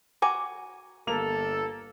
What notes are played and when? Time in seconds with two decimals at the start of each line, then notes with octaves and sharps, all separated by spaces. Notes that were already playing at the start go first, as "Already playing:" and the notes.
0.22 F#4 G#5 A#5 D6
1.07 G1 A#3 A4 F7